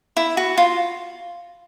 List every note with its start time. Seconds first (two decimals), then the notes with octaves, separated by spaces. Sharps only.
0.17 E4
0.37 F#4
0.58 F4